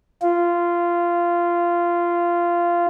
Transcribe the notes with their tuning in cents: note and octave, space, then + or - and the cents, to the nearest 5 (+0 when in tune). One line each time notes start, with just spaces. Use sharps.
F4 -15